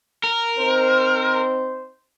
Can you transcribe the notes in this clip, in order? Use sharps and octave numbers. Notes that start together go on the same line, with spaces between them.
A#4
C4 D#4 C5